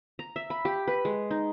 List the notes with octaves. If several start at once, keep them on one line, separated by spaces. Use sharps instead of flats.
A#5
E5
B5
G4
B4
G#3
D#4